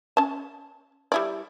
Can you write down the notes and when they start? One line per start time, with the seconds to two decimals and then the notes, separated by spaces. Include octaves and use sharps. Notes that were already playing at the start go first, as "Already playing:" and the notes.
0.17 C#4 A5
1.12 G3 E4 D5